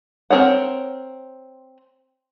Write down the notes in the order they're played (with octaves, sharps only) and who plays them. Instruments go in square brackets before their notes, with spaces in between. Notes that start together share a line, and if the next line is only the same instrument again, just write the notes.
[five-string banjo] C4 G#4 A#4 C#5 F#5